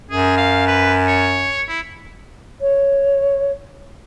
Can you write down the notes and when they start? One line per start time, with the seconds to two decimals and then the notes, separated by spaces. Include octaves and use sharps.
0.11 F#2 G#4
0.37 F5
0.67 B4
1.08 C#5
1.69 E4
2.61 C#5